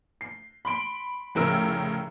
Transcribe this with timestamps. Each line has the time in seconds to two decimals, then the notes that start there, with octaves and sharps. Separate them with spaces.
0.21 C7
0.65 B5 C6 D7
1.35 F1 A2 C#3 A#4 E6